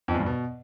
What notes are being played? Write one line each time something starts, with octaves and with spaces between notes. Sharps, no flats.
F2
E2
G2
B2